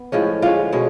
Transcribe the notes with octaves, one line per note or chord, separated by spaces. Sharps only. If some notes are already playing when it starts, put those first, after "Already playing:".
Already playing: B3
A2 F3 G#3 C#4
D3 G#3 C#4 F4
B2 G#3 C#4